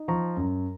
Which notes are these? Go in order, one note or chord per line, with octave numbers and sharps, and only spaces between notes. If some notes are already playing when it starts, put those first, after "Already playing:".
Already playing: D#4
F3 A#5 C#6
F#2